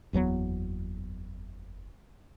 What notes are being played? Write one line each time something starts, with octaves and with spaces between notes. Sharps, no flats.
F#1 E2 F#3 B3